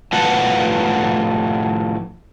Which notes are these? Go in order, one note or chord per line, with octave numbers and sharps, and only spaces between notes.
A2 F3 F#4 B4 F#5 A5